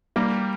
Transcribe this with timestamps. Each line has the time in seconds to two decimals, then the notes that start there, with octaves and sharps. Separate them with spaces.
0.16 G3 A#3 G4